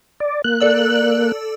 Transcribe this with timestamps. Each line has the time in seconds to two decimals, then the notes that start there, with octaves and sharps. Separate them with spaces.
0.20 D5
0.44 A#3 F#6
0.61 A4 D5 E6